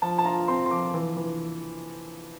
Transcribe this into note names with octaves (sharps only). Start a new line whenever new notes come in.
F3 A5
A5
F4 A#5
C4 C6
C6
F3 D6
E3
E3